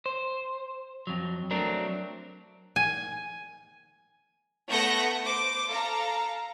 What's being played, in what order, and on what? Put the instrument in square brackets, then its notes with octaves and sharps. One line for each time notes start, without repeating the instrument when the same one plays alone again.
[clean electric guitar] C5
F2 F#3
F#3 A3 C4 D4 A#4
[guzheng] G#5
[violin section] A3 B3 F#5 C#6 G6 A#6
C5 D6
A4 F5 A#5